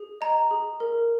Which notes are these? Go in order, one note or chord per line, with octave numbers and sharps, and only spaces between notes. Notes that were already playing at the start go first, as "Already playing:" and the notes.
Already playing: G#4
D#5 A#5
G#4
A#4